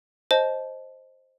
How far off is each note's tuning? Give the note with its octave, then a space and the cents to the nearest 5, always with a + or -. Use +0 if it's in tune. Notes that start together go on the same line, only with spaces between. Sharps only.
C5 +10 D#5 +0 A5 -20